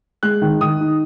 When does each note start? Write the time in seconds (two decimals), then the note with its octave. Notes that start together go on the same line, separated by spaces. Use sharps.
0.23 G#3 F#6
0.42 D#3
0.61 D#3 D#6
0.80 D#4